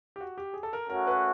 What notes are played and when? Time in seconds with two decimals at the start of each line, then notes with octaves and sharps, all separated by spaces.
0.16 G4
0.20 F#4
0.38 G4
0.54 G#4
0.63 A4
0.73 A#4
0.90 A3 C#4 F#4 A#4
1.07 B4